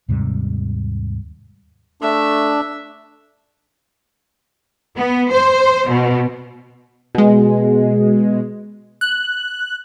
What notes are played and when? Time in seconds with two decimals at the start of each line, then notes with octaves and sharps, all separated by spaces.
0.08 D#2 G#2 C3 G3
2.02 A3 D4 E5
4.95 B3
5.32 C5
5.88 B2
7.15 B2 G#3
9.01 F#6